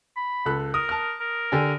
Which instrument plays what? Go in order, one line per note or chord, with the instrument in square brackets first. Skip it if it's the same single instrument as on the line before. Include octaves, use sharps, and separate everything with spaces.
[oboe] B5
[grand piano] C#2 A4 F#6
[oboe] A#4 [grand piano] D#6
[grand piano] A5 F6
[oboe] A#4
[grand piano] D3 G4 G#5